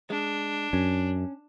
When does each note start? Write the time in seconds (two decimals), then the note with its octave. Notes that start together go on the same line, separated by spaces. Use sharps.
0.10 G#3 D4
0.73 F#2 C#4